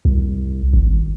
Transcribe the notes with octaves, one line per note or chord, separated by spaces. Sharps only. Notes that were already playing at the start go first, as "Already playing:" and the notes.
C2
G#1